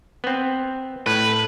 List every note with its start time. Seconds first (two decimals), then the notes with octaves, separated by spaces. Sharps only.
0.24 B3 C4
1.06 A2 B4